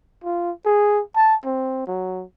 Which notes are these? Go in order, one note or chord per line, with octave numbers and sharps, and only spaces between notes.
F4
G#4
A5
C4
F#3